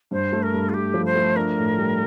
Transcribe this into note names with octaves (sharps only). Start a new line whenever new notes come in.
G2 C5
A3
A#4
G2
F4
A3 G4
F3
C5
A3
D4 A#4
A2
G3